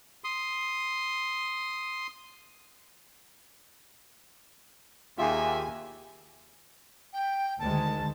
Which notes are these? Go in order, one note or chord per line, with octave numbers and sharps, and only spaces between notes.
C6 D#6
D#2 F4 G4 G#4 E5 G#5
G5
D2 D#3 G#3 A5